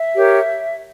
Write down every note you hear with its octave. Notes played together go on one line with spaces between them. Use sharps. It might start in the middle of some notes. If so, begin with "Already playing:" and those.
Already playing: E5
G4 A#4 C#5